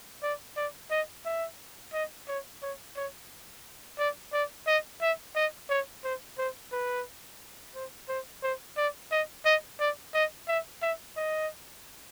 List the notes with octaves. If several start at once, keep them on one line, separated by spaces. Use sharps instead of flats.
D5
D5
D#5
E5
D#5
C#5
C#5
C#5
D5
D5
D#5
E5
D#5
C#5
C5
C5
B4
C5
C5
C5
D5
D#5
D#5
D5
D#5
E5
E5
D#5